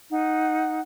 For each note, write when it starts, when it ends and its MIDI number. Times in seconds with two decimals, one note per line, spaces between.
0.11 0.79 63
0.11 0.79 78